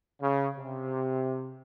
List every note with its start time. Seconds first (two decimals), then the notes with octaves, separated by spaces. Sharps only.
0.21 C#3
0.56 C3